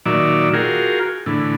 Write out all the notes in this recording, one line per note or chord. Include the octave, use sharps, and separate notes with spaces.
A#2 D#3 F#3 D5 E5
F4 F#4 G#4 A#4 G5
A2 D3 E3